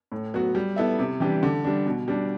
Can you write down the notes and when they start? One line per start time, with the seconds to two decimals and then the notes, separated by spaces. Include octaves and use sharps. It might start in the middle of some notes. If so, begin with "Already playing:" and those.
0.12 A2
0.34 F#3 B3 F#4
0.55 G3
0.76 B3 E4 A4 E5
0.99 C3
1.20 E3 G3 D4 G4
1.43 D3
1.64 G3 D4
1.86 B2
2.08 G3 D4